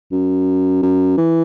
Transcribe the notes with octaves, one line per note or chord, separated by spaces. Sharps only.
F#2
F#2
E3